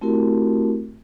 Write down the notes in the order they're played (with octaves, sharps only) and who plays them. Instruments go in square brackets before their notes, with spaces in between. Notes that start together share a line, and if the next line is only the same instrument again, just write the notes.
[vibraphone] A3 C4 E4 F#4 G4 A#4